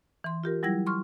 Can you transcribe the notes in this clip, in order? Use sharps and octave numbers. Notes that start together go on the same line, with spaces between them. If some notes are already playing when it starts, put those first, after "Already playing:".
E3 C6
F4 G4 A#4
F#3 G3 E4 G#6 A#6
C6 C#6 F6